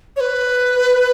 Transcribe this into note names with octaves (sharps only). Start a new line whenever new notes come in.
C#5
B4